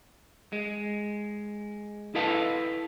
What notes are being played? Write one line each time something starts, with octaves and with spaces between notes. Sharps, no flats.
G#3
E4 A4 B4 D#5 F5 A5